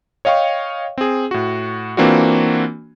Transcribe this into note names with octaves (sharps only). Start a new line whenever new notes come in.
C#5 D#5 F5 G5 C#6
C4 G#4
A2 F#4
E3 A#3 C4 D4 F4 F#4